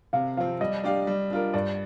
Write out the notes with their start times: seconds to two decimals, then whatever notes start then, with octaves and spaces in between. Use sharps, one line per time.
0.13 C3 F5
0.37 F3 C4 F5
0.61 G3 D#5
0.83 D4 G4 D5 F5
1.07 G3
1.30 D4 F4 A#4
1.54 G2 D5